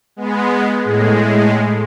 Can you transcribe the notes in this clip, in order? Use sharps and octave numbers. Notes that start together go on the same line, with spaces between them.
G#3 B3
A2 G#3